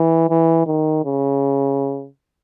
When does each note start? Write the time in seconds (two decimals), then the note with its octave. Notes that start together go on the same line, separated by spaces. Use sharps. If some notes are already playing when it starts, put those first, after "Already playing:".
Already playing: E3
0.29 E3
0.66 D#3
1.05 C#3